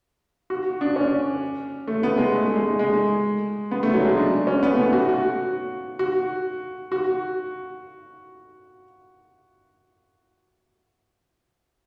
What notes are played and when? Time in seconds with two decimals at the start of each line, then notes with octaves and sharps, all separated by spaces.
0.50 F#4
0.81 D4
0.96 C#4
1.87 A3
2.03 B3
2.18 G#3
2.34 A3
2.56 G#3
2.79 G#3
3.71 B3
3.83 A3
3.94 F#3
4.05 G#3
4.17 D4
4.47 C#4
4.63 B3
4.71 A3
4.77 B3
4.93 F#4
5.09 F#4
5.99 F#4
6.92 F#4